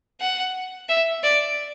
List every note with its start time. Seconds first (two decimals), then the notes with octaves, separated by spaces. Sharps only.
0.21 F#5
0.88 E5
1.23 D5